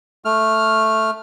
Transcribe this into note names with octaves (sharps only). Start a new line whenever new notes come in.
A3 F6